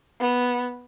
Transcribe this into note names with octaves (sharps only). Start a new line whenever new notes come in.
B3